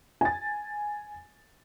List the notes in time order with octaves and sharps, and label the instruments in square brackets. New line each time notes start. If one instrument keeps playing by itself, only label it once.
[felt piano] G#5 A6